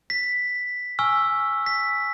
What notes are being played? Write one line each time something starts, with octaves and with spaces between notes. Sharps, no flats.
B6
G#5 C#6 E6 F6
B6